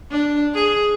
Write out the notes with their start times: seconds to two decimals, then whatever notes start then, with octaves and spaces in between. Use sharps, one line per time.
0.10 D4
0.54 G#4